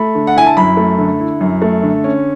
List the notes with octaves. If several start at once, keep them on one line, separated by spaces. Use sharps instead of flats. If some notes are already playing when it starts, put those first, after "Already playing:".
Already playing: A3 B5
D3
F#5
E4 G#5
A5
F#2 B5
A3
D3
E4
F#2
A3
D3
C#4